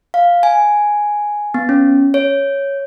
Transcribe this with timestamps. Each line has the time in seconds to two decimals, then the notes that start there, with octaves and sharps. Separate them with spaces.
0.14 F5
0.43 G#5
1.54 B3
1.69 C#4
2.14 C#5